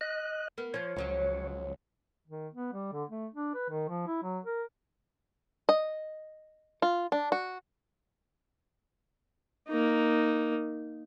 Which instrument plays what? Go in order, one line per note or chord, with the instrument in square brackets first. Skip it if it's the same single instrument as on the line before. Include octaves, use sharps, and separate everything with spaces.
[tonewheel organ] D#5 F#6
[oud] A#3 B3
[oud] F3 F4 [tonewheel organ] C#5
[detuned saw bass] C#2 [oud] F3 F#3 C#4
[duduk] D#3
B3
G3
D3
A3
D4
B4
D#3
F3
E4
F#3
A#4
[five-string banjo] D#5
F4
D4
F#4
[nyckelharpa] A#3 D#4